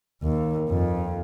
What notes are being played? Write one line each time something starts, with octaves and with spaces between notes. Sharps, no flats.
D#2
F2